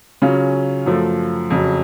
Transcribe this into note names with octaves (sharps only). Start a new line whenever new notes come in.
C#3 F#3 C#4 F4
F#2 F3 A3
F2 C#3 F#3